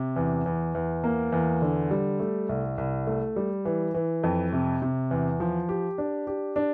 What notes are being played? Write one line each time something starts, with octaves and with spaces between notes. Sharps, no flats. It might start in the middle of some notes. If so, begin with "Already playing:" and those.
Already playing: C3
E2
E2
E2
A#3
E2
D3
G3
A3
C2
C2
A3
G3
E3
E3
F2
C3
C3
E2
F3
G4
D4
G4
D4